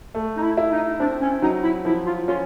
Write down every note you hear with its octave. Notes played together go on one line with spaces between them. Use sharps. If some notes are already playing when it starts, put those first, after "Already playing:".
A3
D#4
E4
E4
D#4
C4 D4
C#4
F#3 D#4
E4
F3 E4
F4
C#4 F4